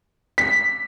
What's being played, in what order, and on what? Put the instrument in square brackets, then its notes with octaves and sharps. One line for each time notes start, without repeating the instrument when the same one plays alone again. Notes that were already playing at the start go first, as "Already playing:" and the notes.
[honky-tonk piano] B6